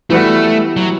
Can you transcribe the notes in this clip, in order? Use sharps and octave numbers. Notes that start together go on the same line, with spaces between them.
E3 G3 A3 B3 F#4 B4
F#3